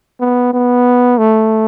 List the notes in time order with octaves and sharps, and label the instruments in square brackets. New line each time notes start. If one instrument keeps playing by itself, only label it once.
[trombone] B3
B3
A3